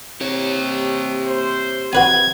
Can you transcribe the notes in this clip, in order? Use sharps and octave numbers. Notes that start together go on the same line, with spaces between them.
C3 G4 C#5
C5
C3 F#4 B4 G#5 G#6